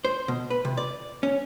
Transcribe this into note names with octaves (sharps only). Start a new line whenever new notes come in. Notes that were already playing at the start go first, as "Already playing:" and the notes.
C5
B2
B4
C3
D5
C#4